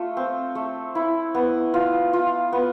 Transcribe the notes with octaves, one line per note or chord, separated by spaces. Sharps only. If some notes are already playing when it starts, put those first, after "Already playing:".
Already playing: A3 F4
C4
A3
E4
B3
F4
F4
B3